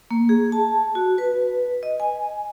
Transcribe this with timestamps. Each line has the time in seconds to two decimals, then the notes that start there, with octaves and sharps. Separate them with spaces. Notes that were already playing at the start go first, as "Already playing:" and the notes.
0.11 A#3
0.29 G#4
0.52 A5
0.95 F#4
1.18 B4
1.83 D#5
2.00 G#5